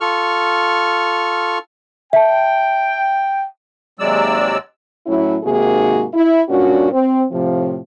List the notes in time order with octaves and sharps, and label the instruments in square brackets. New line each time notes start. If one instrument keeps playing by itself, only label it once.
[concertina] F4 A4 C#6 F6
[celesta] E5 A5 [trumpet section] G5
[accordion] D#2 C3 F#3 G#3 D5 E6
[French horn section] A2 F#3 C#4 E4
G#2 C3 D#3 A#3 F#4 G#4
E4
G2 A#2 C#4 D4 F#4
C4
A2 C3 F3